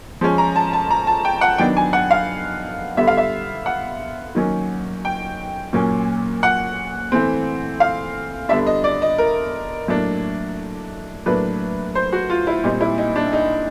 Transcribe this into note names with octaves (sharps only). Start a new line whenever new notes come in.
F3 G#3 C#4
A#5
A5
A5
A#5
A5
G5
F#5
D#3 F#3 B3 D4 G5
G#5
F#5
F5
D3 G3 B3 E5
F5
E5
F#5
D#3 F#3 A#3 C#4
G5
A#2 F#3 A#3 C#4
F#5
E3 A3 C4
F5
D3 G3 B3 D4 E5
D#5
D5
D#5
A#4
A2 F#3 A#3 D4
A2 F#3 A#3 D4 B4
C5
F#4
F4
E4
A#2 G3 C4 D#4
E4
D#4
D4
D#4